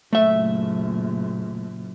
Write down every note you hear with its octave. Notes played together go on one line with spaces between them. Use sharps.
F#1 A#2 A3 E5